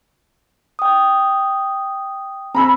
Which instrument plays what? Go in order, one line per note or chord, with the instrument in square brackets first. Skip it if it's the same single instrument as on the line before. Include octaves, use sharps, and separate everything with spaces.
[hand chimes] G5 D#6
[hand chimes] C4 [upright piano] A#5 B5 E6